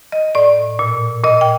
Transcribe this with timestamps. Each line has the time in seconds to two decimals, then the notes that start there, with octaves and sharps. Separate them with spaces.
0.12 D#5
0.35 A2 D5
0.79 A#2
1.24 A#2 D#5
1.41 G5